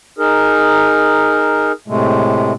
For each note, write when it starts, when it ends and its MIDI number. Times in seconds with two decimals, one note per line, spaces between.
0.19 1.72 63
0.19 1.72 68
0.19 1.72 70
1.88 2.53 45
1.88 2.53 48
1.88 2.53 56
1.88 2.53 57